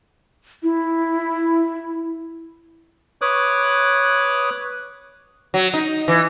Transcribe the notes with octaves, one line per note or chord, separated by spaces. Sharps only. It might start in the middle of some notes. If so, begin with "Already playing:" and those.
E4
B4 C#5 D6 D#6 F#6
F#3
D#4
E3